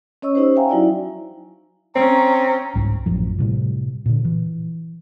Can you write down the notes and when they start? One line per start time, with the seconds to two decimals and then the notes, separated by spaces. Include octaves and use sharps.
0.22 C#4 C#5 D#5 C#6 E6
0.35 C#4 D#4 G4 C5
0.56 E5 F5 G5 G#5 A#5
0.69 F#3 D#4 E4 F#4 D5
1.96 C4 C#4 A#5
2.75 C2 G#2
3.06 A1 F#2 F3
3.39 A2 C3 G3
4.06 A#2 D3
4.25 E3